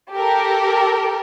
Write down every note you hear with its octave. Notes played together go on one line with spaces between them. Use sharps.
G4 A4 A#4